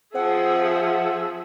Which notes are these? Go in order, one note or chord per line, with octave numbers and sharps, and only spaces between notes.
F3 C4 G#4 E5 F#5